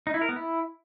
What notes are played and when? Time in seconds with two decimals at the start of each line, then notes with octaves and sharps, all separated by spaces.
0.07 D#4
0.14 E4
0.21 A#4
0.29 B3
0.36 E4